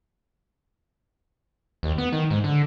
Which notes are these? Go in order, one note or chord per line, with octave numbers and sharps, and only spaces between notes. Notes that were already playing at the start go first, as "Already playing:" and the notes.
D#2
B3
D#3
G#2
D3